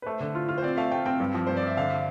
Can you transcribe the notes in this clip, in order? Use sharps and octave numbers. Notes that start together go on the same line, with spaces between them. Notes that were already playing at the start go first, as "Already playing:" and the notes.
B4
A3 C5
D3
F4
F4
C5
C4 D5
A3 F5
A3 G5
C4 G5
G2
F3
G2 C5
D5
G2 E5
D3 F5